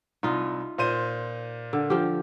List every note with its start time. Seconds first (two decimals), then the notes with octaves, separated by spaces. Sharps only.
0.23 C2 C3 D#4 F4 D#5
0.78 A#2 C5 D#7
1.73 D3
1.90 F3 F4 G4